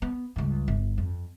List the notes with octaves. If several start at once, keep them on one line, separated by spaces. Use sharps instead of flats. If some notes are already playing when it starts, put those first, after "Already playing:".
B3
C#2 G2
G1
F2